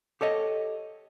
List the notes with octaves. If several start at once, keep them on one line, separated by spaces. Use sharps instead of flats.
G4 A4 C#5 D#5